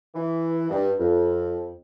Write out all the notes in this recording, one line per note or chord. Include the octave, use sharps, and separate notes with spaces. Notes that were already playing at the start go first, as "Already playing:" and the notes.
E3
G2
F2